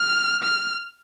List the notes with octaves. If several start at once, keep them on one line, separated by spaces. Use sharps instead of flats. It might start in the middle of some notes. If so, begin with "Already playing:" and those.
Already playing: F6
F6